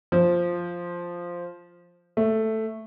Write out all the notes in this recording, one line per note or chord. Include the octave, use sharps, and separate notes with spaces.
F3
A3